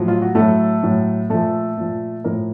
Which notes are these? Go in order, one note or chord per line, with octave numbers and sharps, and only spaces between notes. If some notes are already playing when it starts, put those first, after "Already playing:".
Already playing: A2 F3 F#3
F4
F#4
A2 A3 A4
F#3
A2 F#3
A#2 F3 A3 A4
A#2 F3
A2 F3 A#3 A#4